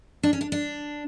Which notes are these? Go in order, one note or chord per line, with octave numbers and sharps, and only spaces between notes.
D4
C#4
D4
D4